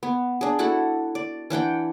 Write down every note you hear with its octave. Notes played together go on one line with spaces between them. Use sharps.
B3
D4 G#4
E4 F#4 A4 F#5
D5
E3 D4 F#5 G5